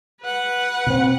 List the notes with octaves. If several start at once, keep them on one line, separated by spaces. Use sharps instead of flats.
B4 F#5
B2 C4